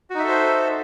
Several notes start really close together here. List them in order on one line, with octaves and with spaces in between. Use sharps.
F#4 D#4 E5 A4 C5